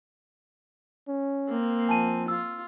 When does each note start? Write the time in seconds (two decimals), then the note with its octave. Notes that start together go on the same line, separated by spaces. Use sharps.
1.08 C#4
1.48 A#3 C4
1.89 F3 G#5 A5 D#7
2.28 F4 E6